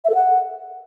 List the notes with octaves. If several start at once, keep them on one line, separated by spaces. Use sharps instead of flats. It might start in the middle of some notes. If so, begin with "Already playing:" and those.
E5
A4
F#5